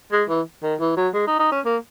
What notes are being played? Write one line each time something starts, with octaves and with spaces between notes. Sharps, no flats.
G#3
E3
D#3
E3
F#3
G#3
D#4
D#4
C#4
A#3